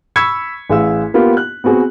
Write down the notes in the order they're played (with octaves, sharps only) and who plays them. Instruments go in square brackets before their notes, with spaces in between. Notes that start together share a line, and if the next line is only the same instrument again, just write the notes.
[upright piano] B5 C#6 E6 G#6 B6 C#7
A1 G#4 F5 E6
A#3 B3 F4 G4
F#6
B3 C4 F#4 G#4